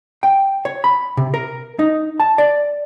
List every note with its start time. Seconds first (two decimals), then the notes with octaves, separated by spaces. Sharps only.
0.23 G5
0.65 C#5
0.84 B5
1.17 C3
1.34 A#4
1.79 D#4
2.20 A5
2.38 D5